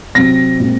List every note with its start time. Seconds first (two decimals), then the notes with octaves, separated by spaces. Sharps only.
0.15 C3 F#3 C4 A#6
0.60 A#2 G#3 C4